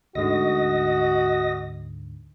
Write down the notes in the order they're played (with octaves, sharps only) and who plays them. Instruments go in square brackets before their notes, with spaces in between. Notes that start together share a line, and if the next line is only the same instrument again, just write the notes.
[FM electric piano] D2 G#2 D3 [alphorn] F#4 [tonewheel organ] D#5 D#6 A#6